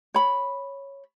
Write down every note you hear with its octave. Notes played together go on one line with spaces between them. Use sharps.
C#5 B5